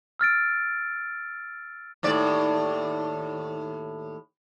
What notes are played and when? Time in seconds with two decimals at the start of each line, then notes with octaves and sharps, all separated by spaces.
0.19 E6 F6 A6 D7
2.03 D#2 A2 D5